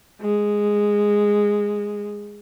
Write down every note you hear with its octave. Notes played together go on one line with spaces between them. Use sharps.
G#3